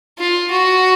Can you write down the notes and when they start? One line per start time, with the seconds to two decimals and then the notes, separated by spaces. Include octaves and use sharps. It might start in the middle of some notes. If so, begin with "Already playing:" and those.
0.19 F4
0.51 F#4